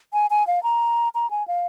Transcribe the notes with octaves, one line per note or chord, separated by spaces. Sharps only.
G#5
G#5
F5
A#5
A#5
G#5
F5